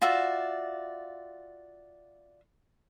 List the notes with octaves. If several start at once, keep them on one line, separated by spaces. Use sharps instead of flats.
F4 F#4 D5 E5